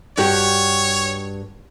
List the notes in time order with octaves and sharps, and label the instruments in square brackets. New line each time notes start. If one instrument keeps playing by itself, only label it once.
[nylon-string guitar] G2 F#4 G4 [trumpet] C#5